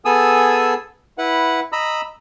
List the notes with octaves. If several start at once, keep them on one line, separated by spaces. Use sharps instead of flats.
B3 G#4 A4 G#5 D#6 E6
E4 B4 F#5
D#5 A#5 B5 E6